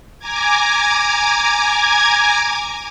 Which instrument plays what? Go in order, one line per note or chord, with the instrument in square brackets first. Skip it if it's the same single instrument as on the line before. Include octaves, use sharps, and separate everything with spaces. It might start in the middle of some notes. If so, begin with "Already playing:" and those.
[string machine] G#5 A#5 D6 G#6